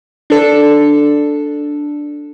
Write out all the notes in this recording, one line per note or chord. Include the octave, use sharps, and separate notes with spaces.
D4 A4